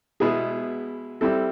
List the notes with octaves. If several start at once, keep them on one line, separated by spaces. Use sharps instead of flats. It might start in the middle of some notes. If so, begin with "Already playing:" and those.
B2 G#3 B3 E4 G#4
G3 C4 E4 A4